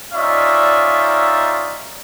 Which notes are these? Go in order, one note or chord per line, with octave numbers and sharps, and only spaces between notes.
C#4 D#4 F4 D5 E5